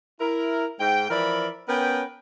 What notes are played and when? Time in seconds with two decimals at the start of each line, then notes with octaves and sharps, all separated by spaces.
0.20 E4 A#4
0.79 G#2 G5
1.10 E3 F3 A#4 D5 E5 B5
1.68 B3 C#4 A#4 B4 G5